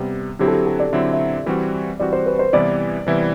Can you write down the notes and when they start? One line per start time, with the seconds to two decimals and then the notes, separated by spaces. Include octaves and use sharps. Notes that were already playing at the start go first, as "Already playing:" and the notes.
Already playing: C3 G3 B3
0.39 D3 F#3 C4 E4 G4
0.48 A4
0.52 G4
0.66 A4
0.80 D5
0.93 D3 F#3 C4 E4 E5
1.13 E5
1.46 E3 G3 C4 F#4
2.00 E3 G3 C4 F#4 D5
2.13 C5
2.26 B4
2.39 C5
2.53 C3 E3 G3 B3 E4 D5
3.06 C3 E3 G3 B3 E4